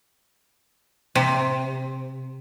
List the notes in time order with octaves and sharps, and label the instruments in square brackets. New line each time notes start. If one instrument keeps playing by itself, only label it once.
[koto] C3